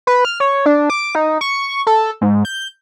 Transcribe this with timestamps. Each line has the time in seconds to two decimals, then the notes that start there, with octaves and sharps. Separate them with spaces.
0.07 B4
0.25 F6
0.40 C#5
0.66 D4
0.90 D6
1.15 D#4
1.41 C#6
1.87 A4
2.21 G#2
2.45 G6